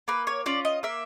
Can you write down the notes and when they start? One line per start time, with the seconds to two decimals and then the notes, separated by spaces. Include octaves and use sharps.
0.08 A#3 B4
0.27 C#5
0.46 C#4 F4 D5
0.65 D#5
0.83 A#3 E5